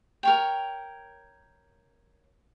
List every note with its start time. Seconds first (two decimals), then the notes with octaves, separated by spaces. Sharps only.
0.23 A#4 C#5 G5